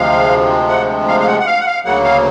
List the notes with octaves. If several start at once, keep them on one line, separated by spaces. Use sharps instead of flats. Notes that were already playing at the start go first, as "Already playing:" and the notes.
Already playing: D2 C3 F3 G#3 F5
F#5
F5
F5
F#5
F#5
F5
F#5
F5
D2 C#3 F#3 A#3 F#5
F5